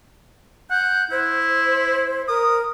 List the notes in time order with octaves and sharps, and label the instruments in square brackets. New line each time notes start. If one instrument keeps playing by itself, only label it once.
[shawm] F#5 [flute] G6
[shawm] E4 [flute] C5
[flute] A#4 [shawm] D#6